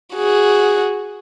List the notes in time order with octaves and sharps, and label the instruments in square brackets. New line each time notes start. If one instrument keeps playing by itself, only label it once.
[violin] F#4 G#4